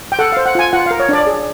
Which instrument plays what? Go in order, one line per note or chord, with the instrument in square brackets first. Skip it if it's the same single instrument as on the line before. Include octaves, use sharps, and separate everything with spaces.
[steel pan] G5
A4 F#5
C5 F5
F#5
F4 G#5
F4 F#5
F5
A#4
C#5
D4 D5
G#4